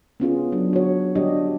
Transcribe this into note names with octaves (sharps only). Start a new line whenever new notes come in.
B3 C#4 F4 G#4
F#3 D4
F#4 C#5
G3 D4 F#4 G4 D5 D#5